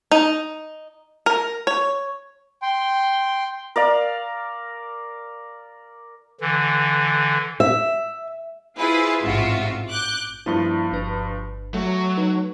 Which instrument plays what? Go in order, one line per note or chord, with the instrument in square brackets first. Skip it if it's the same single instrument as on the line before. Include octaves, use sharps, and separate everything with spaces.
[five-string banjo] D#4
A#4
C#5
[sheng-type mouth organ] G5 C6
[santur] A#4 D5 F5
[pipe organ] D3 E3
[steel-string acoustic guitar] E5
[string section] E4 F4 G#4 B4 C5
A1 G#2 C3 F4 F#4 E5
D6 F#6 G6
[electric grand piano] G2 F3 [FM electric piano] A#3 E4
[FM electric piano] G1 D4 B4
[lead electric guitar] F#3 [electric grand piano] A3
[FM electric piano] D#4 B4